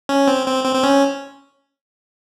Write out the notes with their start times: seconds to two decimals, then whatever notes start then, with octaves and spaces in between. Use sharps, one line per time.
0.09 C#4
0.28 C4
0.47 C4
0.64 C4
0.75 C4
0.83 C#4